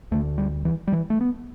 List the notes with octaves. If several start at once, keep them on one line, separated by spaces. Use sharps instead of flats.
D2 D3 A3
G3
E3
G3
E3
A3
B3